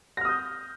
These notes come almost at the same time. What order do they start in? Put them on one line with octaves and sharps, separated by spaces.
A#6 F6 D#6 G6